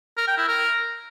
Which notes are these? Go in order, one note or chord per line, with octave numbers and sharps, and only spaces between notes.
A#4
G5
E4
A#4